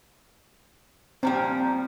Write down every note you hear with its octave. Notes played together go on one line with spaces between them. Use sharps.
A#2 F3 G3 C4